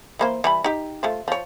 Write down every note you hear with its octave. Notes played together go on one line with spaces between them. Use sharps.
E3 A#3 C5
E3 G3 B5
D#4 G4
A3 F4 C5
F3 C#5